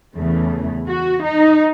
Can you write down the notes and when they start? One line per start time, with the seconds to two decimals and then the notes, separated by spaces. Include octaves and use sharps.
0.16 E2 C#3 E3 A3
0.89 F#4
1.26 D#4